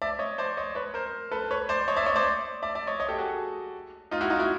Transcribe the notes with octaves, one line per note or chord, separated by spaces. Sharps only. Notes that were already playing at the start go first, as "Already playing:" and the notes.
D5 E5
C#5 D#5
C5 D5
C#5 D#5
B4 C#5
A#4 C5
A4 B4
B4 C#5
C5 D5
C#5 D#5
D5 E5
C#5 D#5
C5 D5
D5 E5
D5 E5
C#5 D#5
C#5 D#5
G4 A4
F#4 G#4
D#4 F4
E4 F#4
D#4 F4
E4 F#4